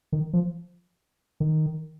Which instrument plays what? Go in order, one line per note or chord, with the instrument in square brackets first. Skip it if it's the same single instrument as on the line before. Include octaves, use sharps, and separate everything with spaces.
[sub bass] D#3
F3
D#3